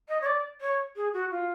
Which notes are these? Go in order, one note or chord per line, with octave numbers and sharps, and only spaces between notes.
D#5
C#5
D5
C#5
G#4
F#4
F4